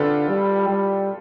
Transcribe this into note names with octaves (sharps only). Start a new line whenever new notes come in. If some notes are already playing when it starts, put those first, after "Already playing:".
Already playing: D3 F4 G4 A4 B4
G3
G3